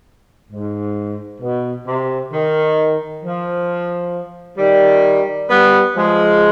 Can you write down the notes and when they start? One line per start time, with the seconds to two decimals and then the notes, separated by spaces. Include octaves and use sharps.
0.50 G#2
1.41 B2
1.86 C3
2.32 D#3
3.23 F3
4.58 D#3 G3
5.49 G3 B3
5.94 F3 G#3